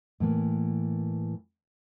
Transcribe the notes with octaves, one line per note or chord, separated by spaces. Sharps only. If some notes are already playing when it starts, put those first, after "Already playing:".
A2 E3 A#3